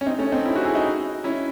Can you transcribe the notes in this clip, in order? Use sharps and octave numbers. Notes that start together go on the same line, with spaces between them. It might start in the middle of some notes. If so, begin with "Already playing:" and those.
C#4
C4 D#4
A3 C#4
C4 D#4
C#4 E4
D#4 F#4
E4 G#4
D#4 F#4
C#4 E4